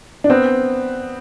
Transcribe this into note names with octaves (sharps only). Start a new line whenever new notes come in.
D4
B3 C4